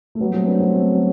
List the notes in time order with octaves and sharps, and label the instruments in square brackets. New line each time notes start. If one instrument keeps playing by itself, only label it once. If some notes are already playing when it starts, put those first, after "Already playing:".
[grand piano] A3
[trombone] F#3 [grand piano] G3 B3
[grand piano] A3 C4
B3 D4
A3 C4
A3 C4